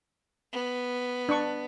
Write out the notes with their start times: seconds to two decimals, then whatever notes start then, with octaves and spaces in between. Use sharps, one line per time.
0.53 B3
1.29 D4 C#6